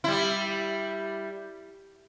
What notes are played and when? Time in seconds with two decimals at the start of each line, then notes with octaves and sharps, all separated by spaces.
0.04 G3 E4